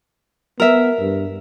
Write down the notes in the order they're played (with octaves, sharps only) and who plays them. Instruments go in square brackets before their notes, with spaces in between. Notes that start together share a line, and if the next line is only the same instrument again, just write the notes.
[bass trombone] B3 [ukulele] A#4 E5
[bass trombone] G2